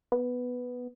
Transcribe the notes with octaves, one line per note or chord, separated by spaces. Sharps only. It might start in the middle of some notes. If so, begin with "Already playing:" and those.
B3